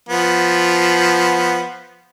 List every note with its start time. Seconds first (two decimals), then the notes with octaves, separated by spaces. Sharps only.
0.09 F3 B3